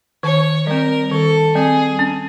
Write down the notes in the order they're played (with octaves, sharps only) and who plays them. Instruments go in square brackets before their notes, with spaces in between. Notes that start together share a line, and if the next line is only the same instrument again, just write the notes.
[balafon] D#3 [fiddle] C#5
[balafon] G3 C4 [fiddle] A#4
[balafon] D#3 [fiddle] A4
[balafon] G3 C4 [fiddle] G#4
[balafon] C#4